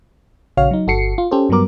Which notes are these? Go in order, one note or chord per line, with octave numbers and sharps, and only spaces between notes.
A#1 C#3 F#4 C#5 F5 F6
F#3 D#4
G1 F#4 A4 C7 C#7
F4
C#4 G4 A4 C5
G2 F#3 G3 B3 A#4 D6